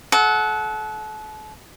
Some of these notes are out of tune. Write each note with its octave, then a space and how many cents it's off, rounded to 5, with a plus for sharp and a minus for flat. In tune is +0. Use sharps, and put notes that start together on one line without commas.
A4 -35 F#5 +0